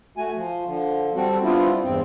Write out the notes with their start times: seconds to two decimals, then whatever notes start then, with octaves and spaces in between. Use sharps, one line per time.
0.18 A3 F#4 G#5
0.36 F3
0.66 D3 F3
1.15 G3 C4 F#4 A4
1.43 G3 B3 C4 D4 E4 F4
1.83 E2 G2 C4